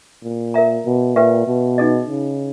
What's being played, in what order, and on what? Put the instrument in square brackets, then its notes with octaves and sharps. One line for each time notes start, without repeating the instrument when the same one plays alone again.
[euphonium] A#2
[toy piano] A#4 E5 A#5
[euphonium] B2
[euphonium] A#2 [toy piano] G4 B4 E5 G5
[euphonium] B2
[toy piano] D#4 G#4 D#5
[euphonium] C#3